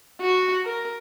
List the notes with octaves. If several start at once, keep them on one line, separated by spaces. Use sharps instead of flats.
F#4
A#4